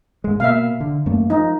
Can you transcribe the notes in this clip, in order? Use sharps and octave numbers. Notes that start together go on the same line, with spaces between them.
G#2 G#3
B2 A#3 E5 F5
D3
F#2 A3 A#3
F3 D#4